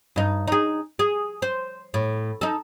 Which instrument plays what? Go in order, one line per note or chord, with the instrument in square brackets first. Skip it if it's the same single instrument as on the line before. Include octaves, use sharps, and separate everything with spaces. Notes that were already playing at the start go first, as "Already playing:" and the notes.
[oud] G2 D#4
D#4 G#4
G#4
C5
A2
D#4 A4